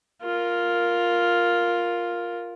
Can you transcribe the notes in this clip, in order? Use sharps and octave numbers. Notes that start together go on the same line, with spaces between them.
F4 A#4